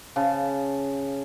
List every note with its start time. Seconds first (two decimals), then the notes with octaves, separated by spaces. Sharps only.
0.16 C#3 A5